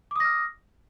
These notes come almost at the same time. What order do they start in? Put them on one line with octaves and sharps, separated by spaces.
D6 D#6 A#6 F6